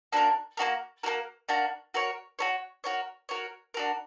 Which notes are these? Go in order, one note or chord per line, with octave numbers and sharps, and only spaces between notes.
A#3 D4 F#4 A#4
A#3 D4 F#4 A#4
A#3 D4 F#4 A#4
A#3 D4 F#4 A#4
F#4 A#4 C#5
F#4 A#4 C#5
F#4 A#4 C#5
F#4 A#4 C#5
D4 F#4 A#4